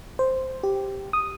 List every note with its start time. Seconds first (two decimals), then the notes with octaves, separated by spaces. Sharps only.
0.19 C5
0.63 G4
1.13 D#6